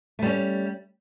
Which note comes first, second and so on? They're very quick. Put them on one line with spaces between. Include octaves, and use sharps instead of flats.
A3 G3 C#4